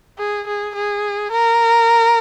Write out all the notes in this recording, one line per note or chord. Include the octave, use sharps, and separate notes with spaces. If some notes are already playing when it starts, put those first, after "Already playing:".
G#4
G#4
G#4
A#4